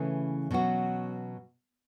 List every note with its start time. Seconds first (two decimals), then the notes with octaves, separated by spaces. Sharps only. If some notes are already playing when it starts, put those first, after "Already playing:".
Already playing: C#3 E3 A3 C#4 E4
0.51 B2 F#3 C#4 F#4